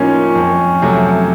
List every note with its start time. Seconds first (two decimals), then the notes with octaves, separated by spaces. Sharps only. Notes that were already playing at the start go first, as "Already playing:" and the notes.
Already playing: A2 F3 A#3 C#4 D#4
0.36 F2
0.82 C3 F#3 A3